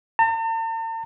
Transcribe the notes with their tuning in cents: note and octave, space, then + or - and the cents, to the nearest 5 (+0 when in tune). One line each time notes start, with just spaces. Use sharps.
A5 +45